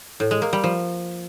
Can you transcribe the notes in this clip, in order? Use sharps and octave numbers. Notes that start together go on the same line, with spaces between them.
A2
G#3
A#3
G3
F3